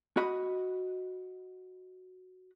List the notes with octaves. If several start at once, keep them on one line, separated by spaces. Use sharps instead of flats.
F#4 D#5 B5